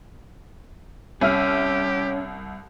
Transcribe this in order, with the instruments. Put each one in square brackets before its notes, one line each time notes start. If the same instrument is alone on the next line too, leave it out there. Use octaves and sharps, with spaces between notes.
[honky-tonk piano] C2 E5 F6 [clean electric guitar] C#4 [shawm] G4